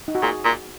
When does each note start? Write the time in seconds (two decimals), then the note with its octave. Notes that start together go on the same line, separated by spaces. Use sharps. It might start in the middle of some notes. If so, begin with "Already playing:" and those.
0.08 D#4
0.15 F#4
0.22 A#2 G#4
0.45 A#2